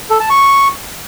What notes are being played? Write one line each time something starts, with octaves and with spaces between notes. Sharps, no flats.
A4
A5
C#6